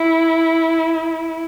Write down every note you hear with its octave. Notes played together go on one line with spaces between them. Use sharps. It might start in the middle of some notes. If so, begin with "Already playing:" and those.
Already playing: E4